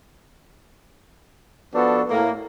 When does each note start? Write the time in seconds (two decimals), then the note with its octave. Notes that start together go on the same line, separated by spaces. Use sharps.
1.75 F3 B3 D4 F#4 A4
2.10 A2 A#3